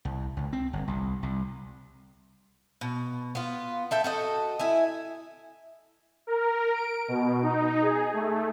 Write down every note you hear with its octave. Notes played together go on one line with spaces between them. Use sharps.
C2
C#2
C4
G1
C2
C2
B2
B3 F4
A4 E5 G5
F#4 A4 D#5
E4 E5 G#5
A#4
D7
B2
D#4
G#4
A3